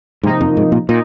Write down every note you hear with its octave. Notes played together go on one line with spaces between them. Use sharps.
G#2 C3 F3 A#3 D#4
F2
G#2
A#2
A#2 D#4